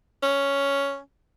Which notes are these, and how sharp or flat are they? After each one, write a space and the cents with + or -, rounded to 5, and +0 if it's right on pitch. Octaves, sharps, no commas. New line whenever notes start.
C#4 +5